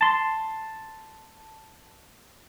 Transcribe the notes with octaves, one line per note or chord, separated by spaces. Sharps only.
A5 C6